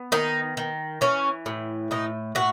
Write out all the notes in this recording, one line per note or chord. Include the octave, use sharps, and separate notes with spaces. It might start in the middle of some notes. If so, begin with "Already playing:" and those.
Already playing: B3
D#3 D#4
D#3
E3 C#4
A2
A2 D#4
A2 F#4